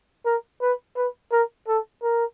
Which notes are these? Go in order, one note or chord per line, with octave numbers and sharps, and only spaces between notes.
A#4
B4
B4
A#4
A4
A#4